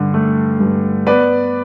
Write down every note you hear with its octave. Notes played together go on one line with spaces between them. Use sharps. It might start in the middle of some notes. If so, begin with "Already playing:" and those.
Already playing: G2 D3
A3
G2
B3 B4 D5